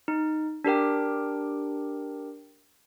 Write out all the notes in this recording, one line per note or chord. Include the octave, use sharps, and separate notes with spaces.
D#4
D4 G4 A#4 G5